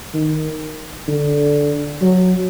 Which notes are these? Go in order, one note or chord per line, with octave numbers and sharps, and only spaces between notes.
D#3
D3
F#3